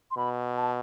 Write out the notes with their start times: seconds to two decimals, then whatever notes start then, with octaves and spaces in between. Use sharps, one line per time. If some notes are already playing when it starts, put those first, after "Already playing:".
0.11 C6
0.17 B2 B5
0.57 A5